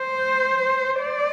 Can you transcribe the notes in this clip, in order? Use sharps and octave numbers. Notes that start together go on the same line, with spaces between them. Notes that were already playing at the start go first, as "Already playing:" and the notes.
Already playing: C5
D5